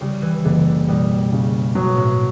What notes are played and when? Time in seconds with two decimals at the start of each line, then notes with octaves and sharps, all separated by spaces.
0.01 C#3 G3
0.22 E3
0.45 F#1 D3
0.88 B2 G3
1.32 C#3
1.75 B2 F#3
1.97 A2